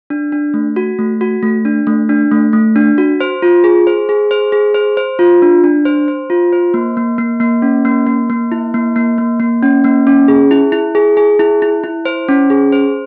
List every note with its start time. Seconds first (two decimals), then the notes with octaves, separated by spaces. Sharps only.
0.10 D4
0.32 D4
0.54 A3
0.76 F#4
0.99 A3
1.21 F#4
1.43 A3
1.65 D4
1.87 A3
2.09 D4
2.32 A3
2.53 A3
2.76 D4
2.98 F#4
3.20 C5
3.42 F4
3.64 G#4
3.87 C5
4.09 G#4
4.31 C5
4.52 G#4
4.74 C5
4.97 C5
5.19 F4
5.42 D4
5.64 D4
5.85 C5
6.08 C5
6.30 F4
6.53 C5
6.74 A#3
6.97 A#3
7.18 A#3
7.40 A#3
7.62 C#4
7.85 A#3
8.07 A#3
8.30 A#3
8.52 E4
8.74 A#3
8.96 A#3
9.18 A#3
9.40 A#3
9.63 C#4
9.84 A#3
10.07 C#4
10.28 G#4
10.51 E4
10.72 E4
10.95 G#4
11.17 G#4
11.39 E4
11.62 E4
11.84 E4
12.05 C5
12.28 C#4
12.50 G#4
12.72 C5